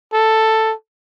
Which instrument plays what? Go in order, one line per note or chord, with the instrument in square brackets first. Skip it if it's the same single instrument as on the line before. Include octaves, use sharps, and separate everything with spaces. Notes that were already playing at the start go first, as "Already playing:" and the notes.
[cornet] A4